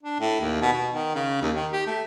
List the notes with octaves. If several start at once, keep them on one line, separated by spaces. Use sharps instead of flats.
D4
A2
D#2
B2
B2
D#3
C#3
D#2
D#3
G4
A3